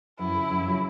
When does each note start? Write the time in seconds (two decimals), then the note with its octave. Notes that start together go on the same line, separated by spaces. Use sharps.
0.19 F#2 E4
0.35 C#3 F#3
0.50 F#2
0.67 C#3 F#3